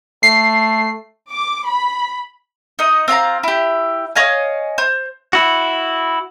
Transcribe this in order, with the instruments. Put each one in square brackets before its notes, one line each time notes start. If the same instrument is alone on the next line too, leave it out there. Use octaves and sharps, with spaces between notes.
[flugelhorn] A3 [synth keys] C7
[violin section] D6
B5
[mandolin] D#4 D#5
C4 F4 F5 A#5
E4 G4
C#5 D#5 F5 G#5
C5
[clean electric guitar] E4 F#4